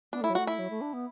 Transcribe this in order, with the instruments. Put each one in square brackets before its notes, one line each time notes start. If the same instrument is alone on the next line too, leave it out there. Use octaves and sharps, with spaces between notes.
[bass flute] B3 [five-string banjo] D4
[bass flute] A3 [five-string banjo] E4
[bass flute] F#3
[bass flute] A3 [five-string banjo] F#4
[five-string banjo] E4
[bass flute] F#3
A3
D4
B3